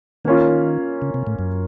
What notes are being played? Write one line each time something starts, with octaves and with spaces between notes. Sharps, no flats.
D#3 A#3 C#4 F4
C#3
C3
A2
F#2